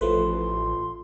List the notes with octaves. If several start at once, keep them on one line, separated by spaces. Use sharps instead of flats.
A1 F3 A3 B4 C6